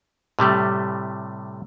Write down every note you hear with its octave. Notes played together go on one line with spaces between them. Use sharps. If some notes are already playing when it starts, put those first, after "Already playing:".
A2 C3 G3 A3